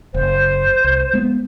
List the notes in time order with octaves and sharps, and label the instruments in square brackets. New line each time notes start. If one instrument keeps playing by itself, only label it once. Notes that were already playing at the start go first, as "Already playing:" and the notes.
[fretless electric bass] F#1 [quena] C5
[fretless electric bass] C2
G#3 B3